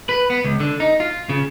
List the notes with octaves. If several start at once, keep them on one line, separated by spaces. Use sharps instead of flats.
B4
B3
C#2
D3
D#4
F4
C#3